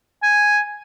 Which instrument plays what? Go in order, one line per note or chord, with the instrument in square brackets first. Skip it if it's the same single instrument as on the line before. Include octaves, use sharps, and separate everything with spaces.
[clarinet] G#5